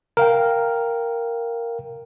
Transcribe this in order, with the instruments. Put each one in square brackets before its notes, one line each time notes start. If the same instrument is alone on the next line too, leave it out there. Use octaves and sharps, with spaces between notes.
[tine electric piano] A#4 F5 G5